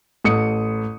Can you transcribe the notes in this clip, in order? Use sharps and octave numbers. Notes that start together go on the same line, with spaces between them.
A1 A4 D#6 C#7